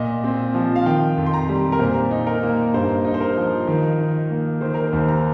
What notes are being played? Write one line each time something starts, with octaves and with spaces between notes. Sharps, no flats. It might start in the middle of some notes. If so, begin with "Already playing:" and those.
Already playing: A#2 D#5
C4
F3
F5
D#3 G5
F2
C6
A#5
G3
A#4
A#2 C5
D#4
A#4
A#3
G2 C5
D#4
C5
A#4
F3
D#3
D#4
A#3
D#3 C5
A#4
C5
D#2
A#5